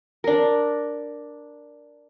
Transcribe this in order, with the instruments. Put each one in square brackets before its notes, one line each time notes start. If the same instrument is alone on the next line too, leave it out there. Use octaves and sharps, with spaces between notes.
[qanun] D4 A#4